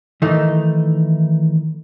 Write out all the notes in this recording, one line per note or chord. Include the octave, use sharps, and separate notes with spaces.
D#3 E3 A3 D#4